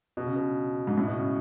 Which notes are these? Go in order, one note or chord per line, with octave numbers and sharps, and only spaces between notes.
B2
C#3
B2
G#2
A2
B2
C#3